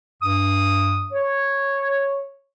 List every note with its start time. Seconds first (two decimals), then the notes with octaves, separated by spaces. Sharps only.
0.21 G2 D#6
1.13 C#5